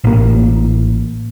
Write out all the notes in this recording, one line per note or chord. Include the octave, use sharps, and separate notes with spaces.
A1 A#3